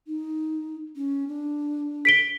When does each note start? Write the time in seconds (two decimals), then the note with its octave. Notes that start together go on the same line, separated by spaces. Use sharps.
0.07 D#4
0.96 C#4
1.28 D4
2.05 B6 D7 G7